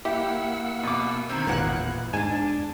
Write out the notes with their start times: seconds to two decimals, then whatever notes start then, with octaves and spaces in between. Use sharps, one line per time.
0.05 A#3 E4 G4 F#5 E6
0.83 B2 D6
1.29 D3 D#3 C4 B5 G#6
1.47 G#1 E2 A#2 C#3 E3 A#3 F#5 F#6
2.13 E2 G#2 D4 G#5 A5